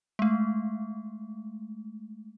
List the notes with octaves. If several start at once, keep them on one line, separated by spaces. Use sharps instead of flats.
G#3 A3